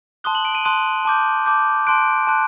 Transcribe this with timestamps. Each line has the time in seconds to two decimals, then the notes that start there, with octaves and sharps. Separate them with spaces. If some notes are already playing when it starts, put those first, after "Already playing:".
0.24 A5 C6 D#6 F#6 G7
0.35 F#7
0.45 D7
0.55 D#7
0.65 A5 C6 D#6 F#6 D#7
1.05 A5 D6 G6
1.46 A5 D6 G6
1.87 A5 C6 F#6 D7
2.27 A5 C6 F#6